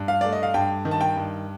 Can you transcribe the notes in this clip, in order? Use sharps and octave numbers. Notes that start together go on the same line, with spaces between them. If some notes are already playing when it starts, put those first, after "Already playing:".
Already playing: G2
F5
A3 D5
D#5
F5
G2 G5
D#3
A5
G5
G2